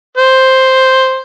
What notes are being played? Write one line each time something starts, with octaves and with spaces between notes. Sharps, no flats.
C5